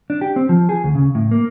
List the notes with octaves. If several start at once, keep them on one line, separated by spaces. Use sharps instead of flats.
D4
G4
C4
F3
G#4
D2
C#3
A2
A#3